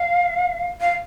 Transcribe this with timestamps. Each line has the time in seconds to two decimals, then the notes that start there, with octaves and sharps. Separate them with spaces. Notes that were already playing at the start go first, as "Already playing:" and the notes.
Already playing: F5
0.81 F5